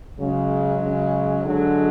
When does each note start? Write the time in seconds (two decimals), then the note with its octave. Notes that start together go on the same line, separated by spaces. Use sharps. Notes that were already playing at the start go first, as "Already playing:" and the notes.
0.20 C#3 F#3 G#3
0.83 C#3
1.45 D3 F#3 G#3